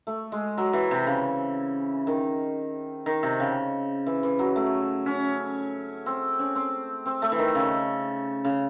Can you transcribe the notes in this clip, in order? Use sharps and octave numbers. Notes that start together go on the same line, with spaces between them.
A3
G#3
F#3
E3
C3
C#3
D#3
D#3
C3
C#3
E3
E3
F#3
A3
C#4
C4
C#4
C4
C4
A3
E3
D#3
C#3
C#3